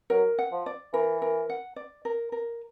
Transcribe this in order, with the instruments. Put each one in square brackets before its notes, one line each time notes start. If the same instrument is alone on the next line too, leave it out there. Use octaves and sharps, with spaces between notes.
[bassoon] F#3 [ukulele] A#4
[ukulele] F#5
[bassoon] F3
[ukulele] D5
[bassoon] E3 [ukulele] A#4
[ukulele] A#4
F#5
D5
A#4
A#4